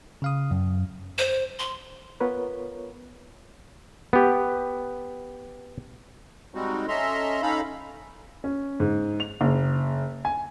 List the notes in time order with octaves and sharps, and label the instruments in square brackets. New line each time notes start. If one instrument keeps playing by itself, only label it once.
[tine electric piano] C#3 F5 D#6
F#2
[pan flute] C5
C6
[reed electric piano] B3 F4 A#4 B4 C#5
[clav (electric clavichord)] B3 G4
[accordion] G3 G#3 C4 D#4 F#4
C#4 A4 D#5 E5 A#5 C6
C#4 D#4 A4 F5 A#5 B5
[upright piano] C#4
G#2
F7
F#1
G#5